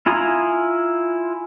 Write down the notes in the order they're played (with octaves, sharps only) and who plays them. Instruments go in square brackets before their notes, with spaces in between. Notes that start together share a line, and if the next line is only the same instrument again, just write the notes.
[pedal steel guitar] E4 F4 G#5 A#5 D#6